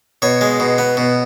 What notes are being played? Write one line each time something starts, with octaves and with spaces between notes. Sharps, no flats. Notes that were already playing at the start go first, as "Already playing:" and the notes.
B2 C#5
G#3
B2
B3
B2